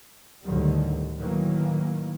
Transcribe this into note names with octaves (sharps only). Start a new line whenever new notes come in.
D2 A2 D3 D#3 F#3 G3
A2 D#3 E3 F#3 A#3